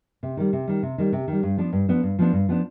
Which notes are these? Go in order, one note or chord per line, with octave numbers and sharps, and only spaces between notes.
C3
D#3 G3
C3
D#3 G3
C3
D#3 G3
C3
D#3 G3
G2
F3 B3 D4
G2
F3 B3 D4
G2
F3 B3 D4
G2
F3 B3 D4